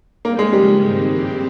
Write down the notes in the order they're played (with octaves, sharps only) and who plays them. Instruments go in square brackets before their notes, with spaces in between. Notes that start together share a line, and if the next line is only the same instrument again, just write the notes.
[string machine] C#3 G3 C4 D#4 [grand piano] A#3
[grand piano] G#3
[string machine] D#2 C#3 F3 G#3 [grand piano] G3
[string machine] G#2 D#3 G#3 C4
G2 F3 C4 G4